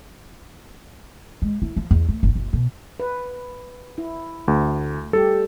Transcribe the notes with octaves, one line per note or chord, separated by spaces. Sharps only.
G#3
E4
F3
E2
A3
G1
F#1
B2
B4
E4
D2 A3
G3 G4 A4